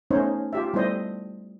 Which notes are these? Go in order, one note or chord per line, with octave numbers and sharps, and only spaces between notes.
A3 B3 C#4 D#4 C5 C#5
F4 G4 E5
G3 A3 B3 E4 C5 D#5